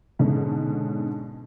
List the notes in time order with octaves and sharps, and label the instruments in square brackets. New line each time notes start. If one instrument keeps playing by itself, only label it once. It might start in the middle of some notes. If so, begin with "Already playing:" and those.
[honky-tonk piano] G#2 B2 D3 C#4